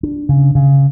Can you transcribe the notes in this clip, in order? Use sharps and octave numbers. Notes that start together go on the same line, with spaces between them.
D4
C#3
C#3